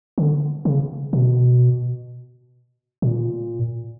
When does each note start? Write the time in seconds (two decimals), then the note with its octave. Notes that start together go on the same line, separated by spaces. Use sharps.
0.18 D3
0.65 C#3
1.13 B2
3.02 A#2